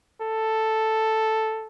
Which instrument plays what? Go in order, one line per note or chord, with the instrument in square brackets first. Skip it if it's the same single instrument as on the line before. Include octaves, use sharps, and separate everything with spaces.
[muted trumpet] A4